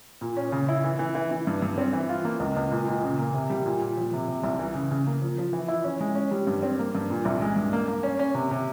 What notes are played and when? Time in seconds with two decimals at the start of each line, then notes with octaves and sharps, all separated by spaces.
0.21 A#2
0.37 C#4
0.52 C#3
0.69 E4
0.84 E3
0.99 E3
1.15 E3
1.31 E3
1.47 G2
1.62 G2
1.78 C4
1.93 E3
2.09 F4
2.25 A#3
2.40 C#2
2.57 C#2
2.72 A#2
2.88 A#2
3.03 C#3
3.19 A#3
3.34 C3
3.50 G3
3.66 A#2
3.81 A#2
3.97 F3
4.13 C3
4.28 C3
4.44 C2
4.59 E3
4.75 C#3
4.91 C#3
5.07 A#3
5.22 F3
5.38 F3
5.53 E3
5.68 E4
5.84 C#4
6.01 G#3
6.15 C#4
6.31 G3
6.47 G2
6.62 C4
6.79 A#3
6.95 G2
7.10 A#2
7.25 C2
7.42 G#3
7.56 G2
7.73 A#3
7.88 A#3
8.03 C#4
8.19 C#4
8.34 C3
8.51 C3